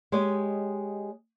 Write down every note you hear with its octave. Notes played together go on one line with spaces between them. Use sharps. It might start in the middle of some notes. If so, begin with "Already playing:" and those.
G#3 G4 C#5 D#5